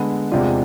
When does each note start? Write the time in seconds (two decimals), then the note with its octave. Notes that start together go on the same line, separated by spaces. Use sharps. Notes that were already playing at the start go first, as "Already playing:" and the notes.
Already playing: D3 G#3 B3
0.32 E2 C3 G#3 D4 F4